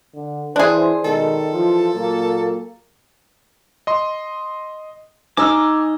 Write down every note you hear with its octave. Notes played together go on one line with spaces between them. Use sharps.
D3
E3 D4 E4 G#4 C5
B2 D#3 G#3 A4
E3 F3 F4
A#2 F#3 A#3
D#5 C6
D#4 D#5 G#5 D6 E6 F6